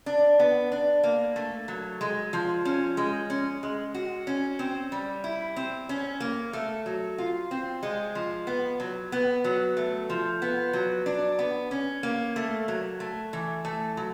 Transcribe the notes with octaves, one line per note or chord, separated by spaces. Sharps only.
D4
B3
D4
A#3
A3
F#3
G#3
F3
C#4
G#3
C#4
G#3
F#4
C#4
C4
G3
E4
C4
C#4
A#3
A3
F#3
F4
C4
G#3
F3
B3
F#3
B3
F#3
A3
F3
B3
F#3
D4
B3
C#4
A#3
A3
F#3
A3
E3
A3
F#3